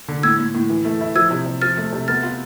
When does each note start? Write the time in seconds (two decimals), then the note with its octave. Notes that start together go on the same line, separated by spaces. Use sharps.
0.08 D3
0.23 A2 E6 G#6
0.39 A2
0.54 A2
0.70 E3
0.85 A3
1.01 E4
1.15 F3 E6 G#6
1.31 C3
1.46 C3
1.61 F3 F6 A6
1.77 A3
1.93 C3
2.08 B3 F6 A6
2.23 F4